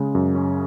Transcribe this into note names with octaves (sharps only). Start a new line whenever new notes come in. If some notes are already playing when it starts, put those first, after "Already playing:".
Already playing: C#3 G#3
F#2
C#4